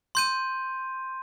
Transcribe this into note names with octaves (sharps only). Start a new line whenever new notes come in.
C6 G6 D#7